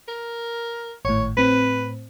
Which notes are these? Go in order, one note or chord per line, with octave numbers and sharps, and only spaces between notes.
A#4
G#1 A2 C#5
A2 C4 B4